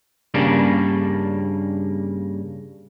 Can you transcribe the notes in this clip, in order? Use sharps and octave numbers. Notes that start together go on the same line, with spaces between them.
G2 C#3 G3 A#3 D4